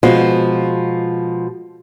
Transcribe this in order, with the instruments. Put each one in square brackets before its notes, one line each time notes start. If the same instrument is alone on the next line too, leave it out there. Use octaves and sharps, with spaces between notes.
[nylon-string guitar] B2 F3 G#3 F4